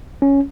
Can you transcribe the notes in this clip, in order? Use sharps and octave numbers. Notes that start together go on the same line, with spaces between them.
C#4